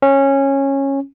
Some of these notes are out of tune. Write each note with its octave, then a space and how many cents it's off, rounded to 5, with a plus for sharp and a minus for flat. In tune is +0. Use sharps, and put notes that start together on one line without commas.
C#4 -15